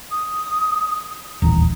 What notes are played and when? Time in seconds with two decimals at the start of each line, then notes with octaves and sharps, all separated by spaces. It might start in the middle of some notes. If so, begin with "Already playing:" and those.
0.11 D#6
1.42 D#1 A1 E2 A#5